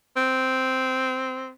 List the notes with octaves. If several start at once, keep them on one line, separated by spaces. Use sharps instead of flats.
C4